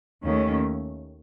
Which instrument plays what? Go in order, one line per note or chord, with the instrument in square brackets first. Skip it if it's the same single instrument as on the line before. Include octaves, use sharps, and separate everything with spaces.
[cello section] D#2 D#3 A3 C#4